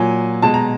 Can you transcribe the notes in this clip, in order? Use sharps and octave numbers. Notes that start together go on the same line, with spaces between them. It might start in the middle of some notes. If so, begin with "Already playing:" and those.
Already playing: A#2 F#3 G#5
B2 G#3 A5
A#5